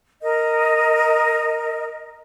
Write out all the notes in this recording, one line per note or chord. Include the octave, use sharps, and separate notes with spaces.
A#4 D#5